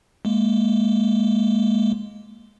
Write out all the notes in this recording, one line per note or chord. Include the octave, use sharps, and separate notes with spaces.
G#3 A#3